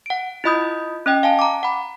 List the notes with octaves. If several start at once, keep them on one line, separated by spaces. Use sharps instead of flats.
F#5 D7
E4 F4 D#5 B5 D#6 G6
C#4 D#5 G5
F5 G#5 A5
A#5 D6
F#5 B5